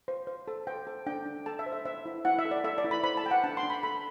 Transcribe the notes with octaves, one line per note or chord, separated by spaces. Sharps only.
C5
C5
A4
C5 G5
A4
D4 G5
D4
A4 A5
E5
C5
E5
C5 E5
E4
E4 F#5
E5
A4
D5
A4 E5
D5
E4
B5
C5 B5
A5
A4 G5
F#5
D4 A5
C6
D4
B5
A4 B5